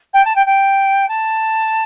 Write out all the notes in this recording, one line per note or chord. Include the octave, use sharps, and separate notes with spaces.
G5
A5
G5
G5
A5